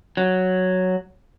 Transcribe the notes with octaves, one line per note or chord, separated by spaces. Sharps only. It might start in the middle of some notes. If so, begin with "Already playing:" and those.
F#3